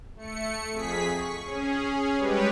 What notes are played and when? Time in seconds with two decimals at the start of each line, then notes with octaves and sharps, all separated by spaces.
0.16 A3 C#7
0.72 F2 G#4 B6
1.14 C#6
1.45 C#4 G#4
2.19 G3 G#3 G4 B4 C#5